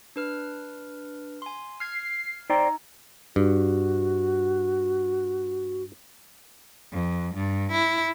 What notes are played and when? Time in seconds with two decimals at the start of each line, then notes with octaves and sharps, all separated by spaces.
0.16 D4 B4 F6
1.42 G#5 C6
1.80 F6 G#6 C7
2.50 D#4 C5 D5 G5 A#5
3.36 G2 F#4
6.92 F2
7.34 G2
7.72 E4